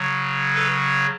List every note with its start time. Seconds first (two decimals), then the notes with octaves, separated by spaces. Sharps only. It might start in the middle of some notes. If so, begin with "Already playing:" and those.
Already playing: C#3 F#3
0.54 A4 B4